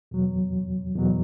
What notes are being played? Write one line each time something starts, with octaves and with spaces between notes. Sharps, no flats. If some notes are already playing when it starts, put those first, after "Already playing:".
E2 B2 F#3
E2 B2 F#3